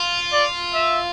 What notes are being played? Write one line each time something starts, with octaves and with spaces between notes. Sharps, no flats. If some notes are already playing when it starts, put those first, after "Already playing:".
Already playing: F4
D5
E5